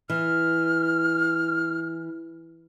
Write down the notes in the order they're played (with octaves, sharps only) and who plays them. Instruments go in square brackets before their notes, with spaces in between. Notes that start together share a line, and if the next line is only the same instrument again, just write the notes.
[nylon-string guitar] E3 [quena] F6